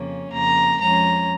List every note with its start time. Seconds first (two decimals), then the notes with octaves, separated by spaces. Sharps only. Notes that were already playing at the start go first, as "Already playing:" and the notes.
Already playing: F2 C#3 A#3 C#4
0.31 F2 C#3 A#3 A#5
0.80 F2 F3 G#3 C#4 A#5